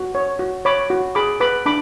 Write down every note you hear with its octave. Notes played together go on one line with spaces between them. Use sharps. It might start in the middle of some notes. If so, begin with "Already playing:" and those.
Already playing: F#4
C#5
F#4
C#5 B5 D6
F#4
G#4 B5 D6
B4 B5 D6
D4 B5 D6